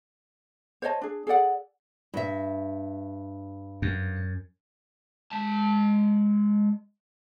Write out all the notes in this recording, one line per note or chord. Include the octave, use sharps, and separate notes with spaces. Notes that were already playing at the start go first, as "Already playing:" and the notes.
C5 C#5 D#5 A5
D4 G#4
G#4 A4 D5 F#5
G2 E5
F#2
G#3 A5